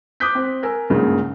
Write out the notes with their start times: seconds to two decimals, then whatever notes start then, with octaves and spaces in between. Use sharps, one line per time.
0.20 D6 D#6 F#6 G6 B6
0.35 C4
0.63 A#4 G#5 E6
0.90 B1 G2 A#2 C#3 G#3